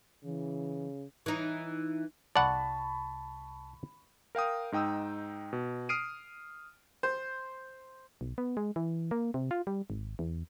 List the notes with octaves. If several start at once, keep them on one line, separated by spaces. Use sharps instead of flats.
C#3 E3
E3 D#4
C2 D5 F#5 A5 B5 C#6
A#4 F5 G5 D#6
G#2 D#4 G5 D#6 E6
B2
D#6 F6 C7 D7 D#7
C5
B1
B3
G#3
E3
A#3
C3
F4
G3
G#1
E2